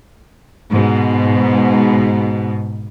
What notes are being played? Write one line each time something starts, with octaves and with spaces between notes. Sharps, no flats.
G#2 B2